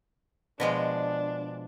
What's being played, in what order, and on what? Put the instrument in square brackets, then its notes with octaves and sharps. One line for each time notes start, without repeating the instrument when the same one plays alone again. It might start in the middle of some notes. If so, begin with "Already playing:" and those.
[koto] B2 F3 G#3 [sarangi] D4